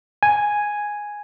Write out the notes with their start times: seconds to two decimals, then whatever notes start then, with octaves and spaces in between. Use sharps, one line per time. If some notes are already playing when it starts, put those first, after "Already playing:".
0.23 G#5